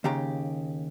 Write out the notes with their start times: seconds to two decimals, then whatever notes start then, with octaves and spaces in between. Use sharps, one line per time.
0.04 D#2 C#3 G4 A#5